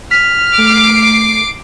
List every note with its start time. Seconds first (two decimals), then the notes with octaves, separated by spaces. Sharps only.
0.11 F6 B6
0.58 A3 D6 C7